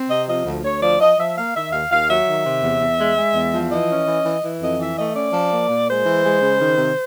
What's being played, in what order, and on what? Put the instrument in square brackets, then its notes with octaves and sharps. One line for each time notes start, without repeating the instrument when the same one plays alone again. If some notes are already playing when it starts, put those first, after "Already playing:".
Already playing: [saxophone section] C4
C3 D#5
F3 D#5
D2
D2 C#5
F3 D5
F3 D#5
F3 E5
A#3 F5
D#3 E5
D#2 F5
D#2 F5
F#3 E5
D#3
C3
E2
E2
G#3
G#3
E2
F3
E3 D#5
C#4
E3
E3
E3
F2 D#5
E3 E5
A3 D#5
C#4 D5
F3
A#3
A#2
G#3 C5
E3
G#3
C#3
D#3
C3